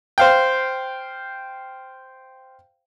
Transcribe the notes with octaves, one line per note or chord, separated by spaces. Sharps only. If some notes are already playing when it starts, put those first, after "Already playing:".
C5 F5 G5